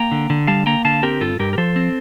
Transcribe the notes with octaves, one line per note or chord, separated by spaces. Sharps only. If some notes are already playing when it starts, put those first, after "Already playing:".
Already playing: A#3 G5 A#5
D3
D3
G3 F5 A5
A#3 G5 A#5
D3 F5 A5
C4 G4 A#4
G2 F4 A4
G2 G4 A#4
A#4
F3 A4 C5
C4